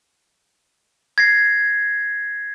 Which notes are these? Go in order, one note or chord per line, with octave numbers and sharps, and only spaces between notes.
G#6 A#6 C7